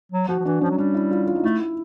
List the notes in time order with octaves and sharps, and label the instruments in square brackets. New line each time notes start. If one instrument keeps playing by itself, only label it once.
[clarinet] F#3
[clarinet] F3 [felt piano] F#4
[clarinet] F3
[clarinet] E3 [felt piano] D4
[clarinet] F3 [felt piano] C#4
[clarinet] F#3
[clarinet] G3 [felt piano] D4
[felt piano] E4
F4
F4
D#4
[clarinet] A3 [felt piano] E4